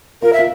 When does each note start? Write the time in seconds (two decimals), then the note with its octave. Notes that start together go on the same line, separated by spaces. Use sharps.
0.22 F4 A#4
0.33 E5
0.39 F4